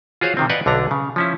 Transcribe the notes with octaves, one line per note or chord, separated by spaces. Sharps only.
F4 F#4 G#4 C5 C#5 F5
C3 D#3 C4
B4 D5 D#5 F5 F#5 G#5
B1 D3 D4 A#5
C#3
F3 C#4 E4